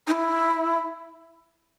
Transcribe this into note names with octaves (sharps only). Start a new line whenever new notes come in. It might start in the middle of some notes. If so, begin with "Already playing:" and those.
D#4
E4